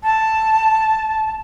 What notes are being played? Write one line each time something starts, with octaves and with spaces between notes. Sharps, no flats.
A5